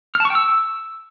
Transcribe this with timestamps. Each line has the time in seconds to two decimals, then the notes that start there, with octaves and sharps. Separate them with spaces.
0.15 F6
0.20 A5
0.25 C#6
0.30 G5
0.35 E6